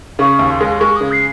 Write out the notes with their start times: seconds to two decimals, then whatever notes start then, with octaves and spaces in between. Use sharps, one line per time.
0.19 C#3 C#6
0.39 D#2
0.50 C6
0.61 G#3
0.80 G#3 C#6
0.96 C#3 D#6
1.12 C7